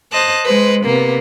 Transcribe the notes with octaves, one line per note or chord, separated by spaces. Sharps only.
C5 D#5 A5 F#6
G#3 B4 C5
C3 A#3 B3